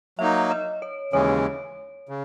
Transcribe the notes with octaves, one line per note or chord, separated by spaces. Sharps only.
F#3 A#3 D#4 E5
D#5
C#5
D#2 C#3 E3 G#3 C#4 C#5
C#3